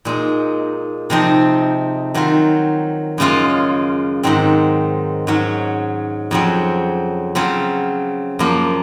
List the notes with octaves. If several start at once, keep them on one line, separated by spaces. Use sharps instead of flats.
A#2 G#3 D#4
C3 F3 C4 D#4
D#3 F#3 C4 F4
F#2 C#3 G#3 C#4 F4
G#2 D#3 F#3 C4
G#2 F#3 C#4
F2 C#3 F#3 C4
C#3 F#3 C4 F4
F#2 F3 A#3 F4